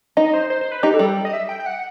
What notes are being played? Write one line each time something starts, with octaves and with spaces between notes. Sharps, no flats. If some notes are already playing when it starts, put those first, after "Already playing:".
D#4 D#5
C5
C5
C5
B4
D#4 G4
A4
G3
D#5
E5
G5
G5
F#5